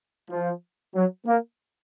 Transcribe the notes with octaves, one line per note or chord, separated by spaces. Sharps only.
F3
F#3
A#3